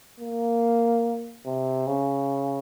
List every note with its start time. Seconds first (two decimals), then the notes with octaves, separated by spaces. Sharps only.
0.20 A#3
1.46 C3
1.87 C#3